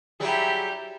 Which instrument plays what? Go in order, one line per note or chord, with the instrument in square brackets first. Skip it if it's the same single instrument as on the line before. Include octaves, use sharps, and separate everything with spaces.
[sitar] F#3 G3 G#4 [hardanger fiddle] E4 G4